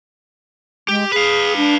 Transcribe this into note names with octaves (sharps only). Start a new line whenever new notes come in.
G#3 G4
G#4 B4 F5
D4